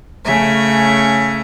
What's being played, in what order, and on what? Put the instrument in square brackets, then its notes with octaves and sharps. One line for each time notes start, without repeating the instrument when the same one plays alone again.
[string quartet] C#3 A3 C#4 E5